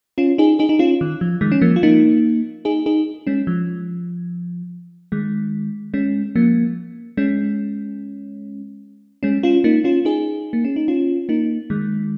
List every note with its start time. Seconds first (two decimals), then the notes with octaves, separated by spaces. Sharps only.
0.18 C#4 F4
0.38 D#4 G#4
0.59 D#4 G#4
0.69 D#4
0.79 C#4 F4
1.01 D#3
1.21 F3
1.41 D#3 G#3
1.52 C#4
1.62 F3 A#3
1.76 F4
1.83 A#3 D#4
2.65 D#4 G#4
2.86 D#4 G#4
3.27 G#3 C#4
3.47 F3
5.12 D#3 G#3
5.94 G#3 C#4
6.36 F3 A#3
7.17 G#3 C#4
9.23 G#3 C#4
9.43 C#4 F4
9.64 A#3 D#4
9.84 C#4 F4
10.05 D#4 G#4
10.53 A#3
10.64 C#4
10.76 D#4
10.88 C#4 F4
11.29 A#3 D#4
11.70 D#3 G#3